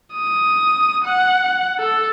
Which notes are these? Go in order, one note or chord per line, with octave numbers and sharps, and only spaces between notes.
D#6
F#5
A4